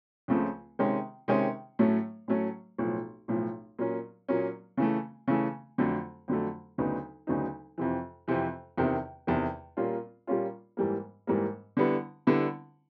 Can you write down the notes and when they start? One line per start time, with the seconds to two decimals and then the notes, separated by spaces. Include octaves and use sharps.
0.28 C#2 C#3 F3 A3 C4
0.79 C3 D#3 G#3 C#4
1.28 C3 D#3 G#3 C#4
1.79 A2 F#3 A3 C#4
2.28 A2 F#3 A3 C#4
2.78 B1 A2 F3
3.28 B1 A2 F3
3.79 A#2 F#3 A#3 C#4
4.29 A#2 F#3 A#3 C#4
4.77 C#3 E3 A3
5.28 C#3 E3 A3
5.78 F2 D3 F#3 A3
6.28 F2 D3 F#3 A3
6.78 D2 C#3 F#3 B3 D#4
7.27 D2 C#3 F#3 B3 D#4
7.78 F2 C3 E3
8.28 F2 C3 E3
8.78 E2 C3 D#3
9.27 E2 C3 D#3
9.77 A#2 G3 A#3 C#4 F4
10.27 A#2 G3 A#3 C#4 F4
10.77 G#2 E3 G3 A#3
11.27 G#2 E3 G3 A#3
11.77 D3 G3 B3 E4
12.27 D3 G3 B3 E4